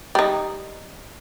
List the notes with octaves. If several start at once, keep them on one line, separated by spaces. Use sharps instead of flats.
G3 D#4